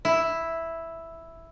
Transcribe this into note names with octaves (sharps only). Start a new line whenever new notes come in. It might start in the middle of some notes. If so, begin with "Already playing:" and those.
E4